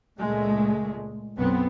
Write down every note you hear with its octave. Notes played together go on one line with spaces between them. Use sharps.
C#2 A#2 G#3 A3
B1 F#2 B3 C4